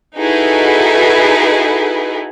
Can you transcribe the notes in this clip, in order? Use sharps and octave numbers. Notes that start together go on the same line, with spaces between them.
D#4 E4 F#4 G#4 A4 B4